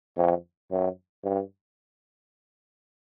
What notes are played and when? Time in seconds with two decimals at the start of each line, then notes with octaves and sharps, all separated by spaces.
0.17 F2
0.71 F#2
1.24 G2